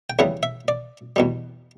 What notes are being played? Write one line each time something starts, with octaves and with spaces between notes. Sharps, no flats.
G5
E2 C#3 E3 G3 F#5
E5
D5
E2 B2 G3